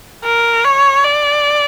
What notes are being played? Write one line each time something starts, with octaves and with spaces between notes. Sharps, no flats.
A#4
C#5
D5